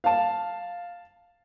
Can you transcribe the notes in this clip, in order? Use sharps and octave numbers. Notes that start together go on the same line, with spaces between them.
F5 A5